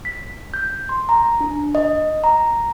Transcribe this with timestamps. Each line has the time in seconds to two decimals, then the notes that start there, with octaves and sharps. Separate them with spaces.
0.05 B6
0.54 G6
0.89 C6
1.09 A#5
1.40 D4
1.75 D#5
2.24 A#5